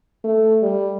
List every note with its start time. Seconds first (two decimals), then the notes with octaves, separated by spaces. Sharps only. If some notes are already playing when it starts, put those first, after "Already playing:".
0.24 A3
0.63 G3